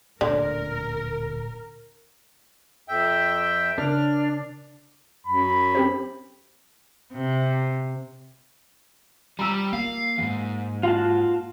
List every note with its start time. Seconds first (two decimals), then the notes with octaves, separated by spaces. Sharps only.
0.21 D1 A#2 D3 A3 A#4
2.88 F2 E5 G5
3.78 C#3 D4 A#4 F6
5.27 F#2 B5
5.75 C4 G4 C5
7.13 C3
9.39 G3 A#5 E6
9.73 A#3 F5
10.18 E2 G#2
10.83 F4 F#4 F5 A5